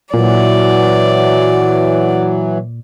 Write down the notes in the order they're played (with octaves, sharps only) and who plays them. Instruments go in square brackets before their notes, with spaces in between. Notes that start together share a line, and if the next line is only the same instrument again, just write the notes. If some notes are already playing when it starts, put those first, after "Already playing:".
[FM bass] A#2 [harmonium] E3 F#3 [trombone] F#4 [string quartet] D5